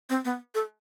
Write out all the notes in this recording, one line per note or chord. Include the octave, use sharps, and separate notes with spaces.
C4
B3
A4